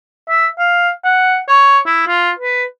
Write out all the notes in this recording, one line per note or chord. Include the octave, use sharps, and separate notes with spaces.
E5
F5
F#5
C#5
E4
F4
B4